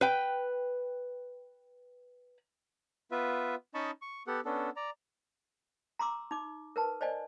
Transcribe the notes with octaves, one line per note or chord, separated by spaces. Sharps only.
B4 G5
B3 F4 B4 E5
C#4 D#4 D#5 A5 B5 C#6
C#6
B3 G4 A4 F#5
B3 C#4 D4 A4
D5 A#5
A#5 C6 D6 E6
D#4 D6
A#4 B4 A5
C5 D5 D#5 G#5